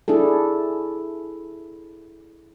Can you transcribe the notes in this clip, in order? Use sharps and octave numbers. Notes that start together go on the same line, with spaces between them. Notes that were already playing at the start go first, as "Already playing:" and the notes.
D4 E4 G#4 A4